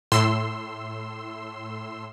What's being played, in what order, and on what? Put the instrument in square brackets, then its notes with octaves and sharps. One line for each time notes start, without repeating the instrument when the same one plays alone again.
[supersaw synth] A2 C6 E6